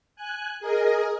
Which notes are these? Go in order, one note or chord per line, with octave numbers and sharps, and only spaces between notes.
G#5 F#6
G#4 A#4 D#5